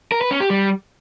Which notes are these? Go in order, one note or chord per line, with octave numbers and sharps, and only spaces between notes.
A#4
B4
C#4
G4
G3